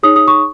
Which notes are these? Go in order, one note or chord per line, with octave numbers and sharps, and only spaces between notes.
D#4 G#4 C#5 D#6
D#6
C#6